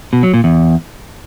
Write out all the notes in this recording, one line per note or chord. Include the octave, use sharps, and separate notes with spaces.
B2
F#3
A#2
E2